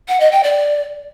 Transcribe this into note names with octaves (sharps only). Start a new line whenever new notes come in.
F#5
D#5
G5
D5